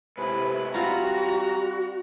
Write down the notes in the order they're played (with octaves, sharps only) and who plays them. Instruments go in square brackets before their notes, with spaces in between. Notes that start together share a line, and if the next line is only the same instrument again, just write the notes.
[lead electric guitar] G#2 E4 [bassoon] C3 [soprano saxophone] B4
[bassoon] G3 [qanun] C4 F4 B4 [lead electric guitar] F#4 [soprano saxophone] A#5